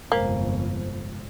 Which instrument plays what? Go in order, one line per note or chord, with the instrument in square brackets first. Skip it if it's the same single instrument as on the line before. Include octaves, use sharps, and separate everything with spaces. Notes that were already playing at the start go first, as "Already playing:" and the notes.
[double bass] G1 F2 [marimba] C3 G#3 C5 [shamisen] A#3